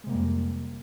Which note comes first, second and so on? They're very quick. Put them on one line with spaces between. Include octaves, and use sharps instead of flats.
G#3 C3 A#3 G3 F2